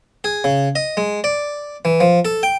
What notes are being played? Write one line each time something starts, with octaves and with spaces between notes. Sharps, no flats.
G#4
C#3
D#5
G#3
D5
E3
F3
A4
G5